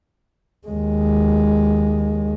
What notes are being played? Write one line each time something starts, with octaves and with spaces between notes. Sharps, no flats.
D#2 G#3